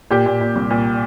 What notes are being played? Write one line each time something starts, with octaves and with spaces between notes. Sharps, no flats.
A#2 G4
A#2
A#2
C2
A#2